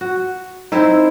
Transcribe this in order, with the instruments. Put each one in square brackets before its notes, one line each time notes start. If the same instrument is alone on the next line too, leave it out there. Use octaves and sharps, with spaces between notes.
[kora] F#4
[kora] C4 E4 C5 [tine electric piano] D#4